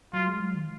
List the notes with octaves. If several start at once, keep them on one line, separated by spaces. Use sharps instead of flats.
F#3 F4
G#3
F#3
D#3